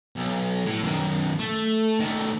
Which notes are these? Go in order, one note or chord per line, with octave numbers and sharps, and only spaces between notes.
B1
A2
F#2 D#3
A3
D#3 A3